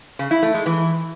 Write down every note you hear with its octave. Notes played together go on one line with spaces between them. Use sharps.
C#3
E4
A3
G#3
E3